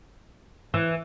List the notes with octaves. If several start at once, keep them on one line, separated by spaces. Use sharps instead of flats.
E3